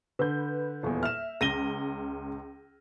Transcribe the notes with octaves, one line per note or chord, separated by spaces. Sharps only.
D3 B4 G6
D#1 E2
E5 F6 E7
C#2 A#6 D#7 G7